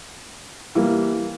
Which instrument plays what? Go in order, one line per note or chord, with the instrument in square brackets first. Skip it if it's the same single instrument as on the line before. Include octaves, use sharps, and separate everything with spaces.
[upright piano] E3 G3 A#3